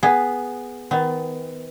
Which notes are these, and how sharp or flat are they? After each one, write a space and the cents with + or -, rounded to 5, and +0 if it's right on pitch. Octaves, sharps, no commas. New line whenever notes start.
B3 +0 G#4 +0
D#3 +35 B3 +30